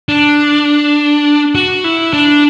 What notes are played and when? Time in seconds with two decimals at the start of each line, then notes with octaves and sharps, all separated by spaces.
0.09 D4
1.55 F#4
1.84 E4
2.13 D4